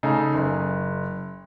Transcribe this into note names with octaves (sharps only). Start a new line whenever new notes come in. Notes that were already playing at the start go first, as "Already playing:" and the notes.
C#3 D#4 A4
F#1